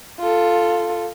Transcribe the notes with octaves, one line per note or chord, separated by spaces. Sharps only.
F4 A4